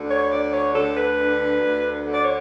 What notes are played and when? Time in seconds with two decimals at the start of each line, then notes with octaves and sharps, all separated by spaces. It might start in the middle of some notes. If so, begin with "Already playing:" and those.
Already playing: D2 D3
0.10 C#5
0.32 D3 D5
0.53 C#5
0.74 D2 A4
0.97 B4
1.18 D3
1.62 D2
2.05 D3
2.14 D5
2.24 C#5